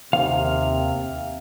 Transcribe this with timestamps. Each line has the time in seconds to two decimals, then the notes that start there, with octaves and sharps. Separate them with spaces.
0.13 D#2 C3 F5